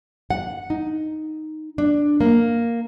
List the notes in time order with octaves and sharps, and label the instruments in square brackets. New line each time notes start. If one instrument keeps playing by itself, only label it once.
[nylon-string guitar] F#5
D#4
D4
A#3